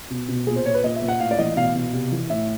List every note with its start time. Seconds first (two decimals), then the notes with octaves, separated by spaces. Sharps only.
0.10 B2
0.28 B2
0.47 A#2 G#4
0.56 C5
0.65 A#2 C#5
0.74 B4
0.83 A#2 D#5
0.96 E5
1.02 A#2
1.08 F#5
1.20 A2 F5
1.31 D5
1.38 E3 D#5
1.56 B2 F5
1.75 B2
1.93 C3
2.12 E3
2.30 A2 E5